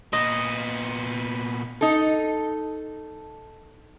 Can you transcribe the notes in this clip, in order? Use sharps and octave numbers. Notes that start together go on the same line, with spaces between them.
A#2 B3 D#5
D#4 A4